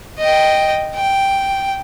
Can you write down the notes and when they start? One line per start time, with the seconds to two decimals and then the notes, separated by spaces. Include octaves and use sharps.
0.19 D#5 G5
0.96 G5